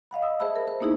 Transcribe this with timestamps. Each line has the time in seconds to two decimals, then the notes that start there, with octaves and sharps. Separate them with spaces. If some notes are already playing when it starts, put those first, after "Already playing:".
0.11 D#5 F5 F#5 B5
0.22 D#6 E6
0.40 G#4 C5 E5 A5 B5 E6
0.56 A#4
0.67 A#4 C5
0.80 A#3 B3 D#4 E4 G#4